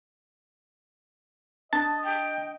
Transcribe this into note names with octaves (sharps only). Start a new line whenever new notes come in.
D4 D#5 A5
G5